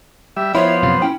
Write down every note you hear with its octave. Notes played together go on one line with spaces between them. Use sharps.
G3 E5
F3 B3 E4 C5 C#5
F#2 C3 F4
C#4 E4 G5